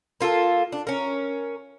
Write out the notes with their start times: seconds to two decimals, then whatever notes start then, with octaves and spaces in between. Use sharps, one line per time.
0.21 A#3 F4 G4 A4
0.72 D4
0.87 C#4 A#4